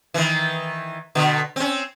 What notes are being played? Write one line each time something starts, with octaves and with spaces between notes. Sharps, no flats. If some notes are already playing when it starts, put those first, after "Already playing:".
D#3 E3
B2 D3
C4 C#4